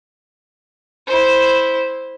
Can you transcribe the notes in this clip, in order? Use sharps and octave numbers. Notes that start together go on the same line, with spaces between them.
E4 C5